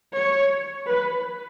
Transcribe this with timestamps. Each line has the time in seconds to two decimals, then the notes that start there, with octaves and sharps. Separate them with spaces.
0.14 C#5
0.86 B4